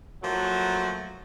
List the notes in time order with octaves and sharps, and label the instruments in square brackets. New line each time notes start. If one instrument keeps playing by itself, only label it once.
[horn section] F3 F#3 A3 A#3 F#4